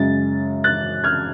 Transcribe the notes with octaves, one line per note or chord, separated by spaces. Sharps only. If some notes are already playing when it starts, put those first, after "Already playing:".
Already playing: F#2 C#3 G#3 A6
F#6 A6
F6 G#6